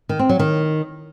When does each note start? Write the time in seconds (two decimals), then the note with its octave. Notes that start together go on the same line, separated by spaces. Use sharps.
0.09 D#3
0.19 C4
0.29 F#3
0.39 D#3